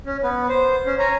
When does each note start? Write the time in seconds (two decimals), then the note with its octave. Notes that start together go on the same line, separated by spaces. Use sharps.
0.06 C#4
0.23 B3 B4
0.49 C5
0.86 C#4
0.99 C#5 G#5 A#5